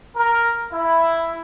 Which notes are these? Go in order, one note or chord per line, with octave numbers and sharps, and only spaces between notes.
A#4
E4